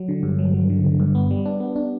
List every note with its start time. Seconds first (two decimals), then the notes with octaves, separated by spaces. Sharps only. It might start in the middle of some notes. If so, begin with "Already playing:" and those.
Already playing: F#3
0.08 D3
0.23 G2
0.39 F#3
0.54 F#3
0.70 D3
0.85 D3
1.00 G2
1.15 B3
1.31 G3
1.45 D4
1.60 B3
1.76 D4